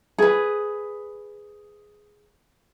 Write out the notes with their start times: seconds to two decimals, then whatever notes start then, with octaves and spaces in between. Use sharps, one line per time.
0.18 G#4 B4